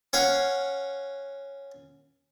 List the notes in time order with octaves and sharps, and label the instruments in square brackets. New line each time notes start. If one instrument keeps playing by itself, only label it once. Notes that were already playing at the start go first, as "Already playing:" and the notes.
[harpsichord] C#4 C#5 F5 F#5